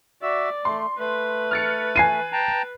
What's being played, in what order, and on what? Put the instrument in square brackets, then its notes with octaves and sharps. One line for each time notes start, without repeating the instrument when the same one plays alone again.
[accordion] F#4 E5 E6 [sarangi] D5
[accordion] A3 [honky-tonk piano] C6
[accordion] A3 [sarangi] B4
[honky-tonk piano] F6 A6 C#7
[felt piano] G#5 C7 D#7
[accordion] G5 A5 A#5